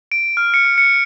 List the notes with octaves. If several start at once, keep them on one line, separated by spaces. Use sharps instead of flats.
D7
F6
C#7
C#7